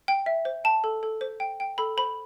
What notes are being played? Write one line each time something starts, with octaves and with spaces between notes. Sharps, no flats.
G5
E5
C5
G5 A5
A4
A4
C5
G5
G5
A4 B5
C5 B5